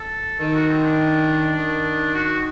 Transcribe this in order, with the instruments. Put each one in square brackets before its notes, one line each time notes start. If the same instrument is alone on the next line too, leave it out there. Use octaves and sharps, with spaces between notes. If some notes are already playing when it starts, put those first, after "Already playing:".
Already playing: [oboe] A4
[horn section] D#3 [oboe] A4
[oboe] F#4
C4
D4
[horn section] D#3
[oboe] F#4